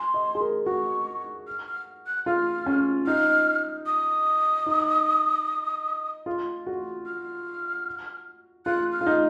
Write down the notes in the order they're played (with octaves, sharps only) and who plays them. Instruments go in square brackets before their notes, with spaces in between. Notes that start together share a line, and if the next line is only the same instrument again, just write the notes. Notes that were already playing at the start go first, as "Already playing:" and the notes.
Already playing: [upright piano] G#5 [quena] C6
[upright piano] D#5
G#4
A#4
[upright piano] F#4 [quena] C#6
[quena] F6
F6
F#6
[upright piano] F4 [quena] F6
[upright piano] C#4
[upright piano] D#4 [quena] F6
[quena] D#6
[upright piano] D#4
F4
F#4
[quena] F6
[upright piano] F4 [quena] F#6
[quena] F6
[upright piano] F4
D#4